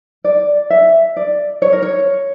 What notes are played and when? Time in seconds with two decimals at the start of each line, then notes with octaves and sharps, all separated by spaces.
0.24 D5
0.70 E5
1.16 D5
1.62 C#5
1.73 A#4
1.82 C#5